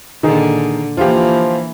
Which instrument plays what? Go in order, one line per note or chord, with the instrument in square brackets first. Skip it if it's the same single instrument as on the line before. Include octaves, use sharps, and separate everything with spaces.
[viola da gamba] A#2 D3 [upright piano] D#3 D#4 G#4
[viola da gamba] E3 A#3 [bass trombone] F3 [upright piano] F4 G4